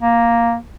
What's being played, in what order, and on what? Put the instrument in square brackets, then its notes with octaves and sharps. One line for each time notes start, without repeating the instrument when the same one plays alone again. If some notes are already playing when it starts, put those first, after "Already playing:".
[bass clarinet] A#3